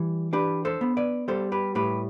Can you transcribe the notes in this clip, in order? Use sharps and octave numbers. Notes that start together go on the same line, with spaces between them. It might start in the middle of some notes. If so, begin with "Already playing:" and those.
Already playing: E3 G3
D4 G4 B4
A4 C5
B3
B4 D5
G3 A4 C5
G4 B4
A2 G4 B4